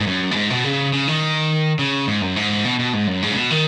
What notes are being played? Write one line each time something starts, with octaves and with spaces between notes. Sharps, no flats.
G#2
F#2
B2
G#2
B2
C#3
C#3
D#3
C#3
G#2
F#2
G#2
B2
B2
G#2
F#2
G#2
C#3
B2
D#3